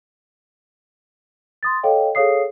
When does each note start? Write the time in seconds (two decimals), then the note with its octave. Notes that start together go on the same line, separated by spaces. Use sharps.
1.63 C6 D#6 A6
1.83 A4 C#5 D#5 F5 G5
2.15 G#4 A4 C#5 F5 D#6 C7